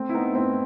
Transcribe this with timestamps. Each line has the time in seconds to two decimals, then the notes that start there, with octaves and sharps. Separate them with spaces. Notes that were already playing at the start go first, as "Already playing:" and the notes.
Already playing: A3 C4
0.09 E4
0.14 B3 D#4
0.35 A3 C4 E4